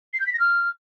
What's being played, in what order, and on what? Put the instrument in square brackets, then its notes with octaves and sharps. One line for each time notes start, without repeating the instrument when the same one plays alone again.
[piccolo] C7
G6
B6
A#6
F6